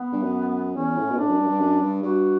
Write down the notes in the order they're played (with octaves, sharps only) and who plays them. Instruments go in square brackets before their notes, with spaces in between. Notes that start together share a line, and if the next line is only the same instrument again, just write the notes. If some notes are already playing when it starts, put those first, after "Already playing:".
Already playing: [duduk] B3
[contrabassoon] G2
F#2
[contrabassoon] E2 [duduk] C#4
[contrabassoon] A2
B2
[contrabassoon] A2 [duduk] D4
[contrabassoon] F#2
G2
F#2
G2
F#2
G2
[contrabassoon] G2 [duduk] F#4